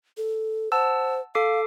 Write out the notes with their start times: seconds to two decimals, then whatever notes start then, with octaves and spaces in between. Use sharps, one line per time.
0.17 A4
0.72 C5 F#5 A5 E6
1.35 A4 F5 D6 C7